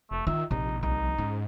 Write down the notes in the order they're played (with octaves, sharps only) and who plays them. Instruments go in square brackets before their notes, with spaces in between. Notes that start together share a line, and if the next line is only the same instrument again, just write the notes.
[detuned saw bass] F1 [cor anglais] A3
[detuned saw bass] D#3 [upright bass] F4 [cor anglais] E5
[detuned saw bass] A#1 [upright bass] C3 [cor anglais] D#4
[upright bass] C2 [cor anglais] D#4
[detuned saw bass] G#2 [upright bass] C#4